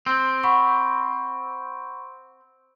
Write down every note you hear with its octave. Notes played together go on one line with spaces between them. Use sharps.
C4
F#5 B5 C#6